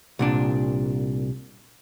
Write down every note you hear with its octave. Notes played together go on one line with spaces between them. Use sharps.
C2 A#2 D4